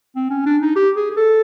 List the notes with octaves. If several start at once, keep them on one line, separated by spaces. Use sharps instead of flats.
C4
C#4
D4
D#4
G4
G#4
G#4
A4